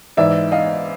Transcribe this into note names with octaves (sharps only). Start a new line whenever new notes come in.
G#2 E3 D5 E5
D#5 F5